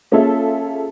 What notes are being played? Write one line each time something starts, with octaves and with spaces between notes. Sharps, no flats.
A#3 C#4 F4 G#4 A4 E5